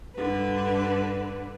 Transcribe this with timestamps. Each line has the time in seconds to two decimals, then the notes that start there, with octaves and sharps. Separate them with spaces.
0.15 G2 D3 B4